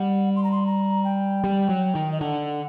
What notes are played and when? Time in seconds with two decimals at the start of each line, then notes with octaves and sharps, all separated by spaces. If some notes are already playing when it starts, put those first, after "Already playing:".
Already playing: G3 F#5
0.36 C6
0.44 A#5
0.52 C6
0.66 A#5
1.04 G5
1.44 G3
1.69 F#3
1.95 D#3
2.12 D#5
2.21 D3 F#5